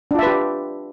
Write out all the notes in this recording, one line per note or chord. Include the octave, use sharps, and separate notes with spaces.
D4 F4 G4 B4 E5